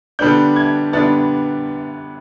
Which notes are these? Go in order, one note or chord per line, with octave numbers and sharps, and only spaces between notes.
D3 G3 B3 D4 G6
G#6
D3 G3 B3 D4 A6